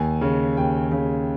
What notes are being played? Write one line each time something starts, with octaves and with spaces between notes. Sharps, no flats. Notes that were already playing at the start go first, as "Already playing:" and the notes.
Already playing: D#2 G#5
C#3
D#2 G5
C#3